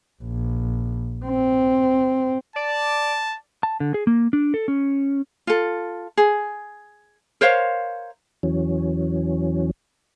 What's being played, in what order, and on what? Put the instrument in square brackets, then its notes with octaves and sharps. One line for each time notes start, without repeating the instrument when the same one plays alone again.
[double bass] A#1
C4
[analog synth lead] D5 [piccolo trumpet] A5
[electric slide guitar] A5
D3
G#4
A#3
D4
A4
C#4
[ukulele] F4 A4
G#4
A#4 C5 C#5 F5
[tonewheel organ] E2 E3 F#3 C#4